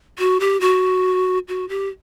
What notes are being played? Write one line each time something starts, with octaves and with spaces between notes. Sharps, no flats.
F#4
G4
F#4
F#4
G4